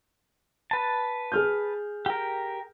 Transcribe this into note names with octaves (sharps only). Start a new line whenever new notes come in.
B4 A5
G#4 F6 G6
G4 A#4